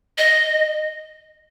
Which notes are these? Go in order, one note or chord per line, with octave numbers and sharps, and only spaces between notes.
D#5